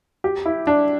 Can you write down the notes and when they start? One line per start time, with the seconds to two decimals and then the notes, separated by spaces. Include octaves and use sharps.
0.24 G4
0.46 E4
0.67 D4